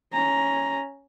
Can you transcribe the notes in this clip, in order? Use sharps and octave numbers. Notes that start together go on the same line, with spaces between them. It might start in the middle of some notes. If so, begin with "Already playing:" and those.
C#4 A#5